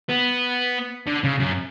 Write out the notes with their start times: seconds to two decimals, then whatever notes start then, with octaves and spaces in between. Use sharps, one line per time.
0.09 B3
1.07 D3
1.24 C#3
1.40 F#2